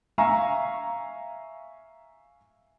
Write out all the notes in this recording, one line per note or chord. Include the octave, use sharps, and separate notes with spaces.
E5 F5 G#5 A#5 C#6